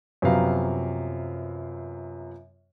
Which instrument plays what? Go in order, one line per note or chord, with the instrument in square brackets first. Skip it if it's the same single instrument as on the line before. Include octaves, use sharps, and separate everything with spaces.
[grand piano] F#2 C3 F3 B3 F5 A#5